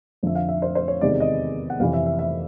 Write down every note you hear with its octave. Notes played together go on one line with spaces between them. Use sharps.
F2 D3 F3 E5
F5
E5
C5
C5
C#5
E2 C3 D#3 G#3 B3 D5
D#5
F#5
F2 C3 E3 F5
E5
E5
E5